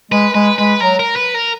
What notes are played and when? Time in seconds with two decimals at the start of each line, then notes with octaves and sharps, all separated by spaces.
0.11 G#3 B4
0.35 G#3 B4
0.58 G#3 B4
0.81 F#3 A#4
1.00 A#4
1.16 B4
1.34 A#4